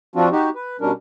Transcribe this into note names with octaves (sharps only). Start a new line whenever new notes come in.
F3 C4 D4 F4 F#4
D#4 F#4 G4
B4
B2 G3 C#4 D4 A#4